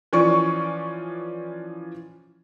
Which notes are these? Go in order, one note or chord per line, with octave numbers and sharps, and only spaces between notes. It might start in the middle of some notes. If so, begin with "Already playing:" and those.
E3 F3 C#4 D5 C#6